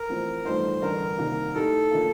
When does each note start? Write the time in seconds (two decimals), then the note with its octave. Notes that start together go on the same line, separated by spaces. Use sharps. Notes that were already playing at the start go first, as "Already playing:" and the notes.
Already playing: A#4
0.09 A1 A2 F3 C4
0.45 A1 G2 F3 A3 D#4 C5
0.82 A1 G2 D3 A3 A#4
1.18 C2 C3 D#3 A#3
1.55 A2 A3 D#4 G4 A4
1.91 D3 F3 A#3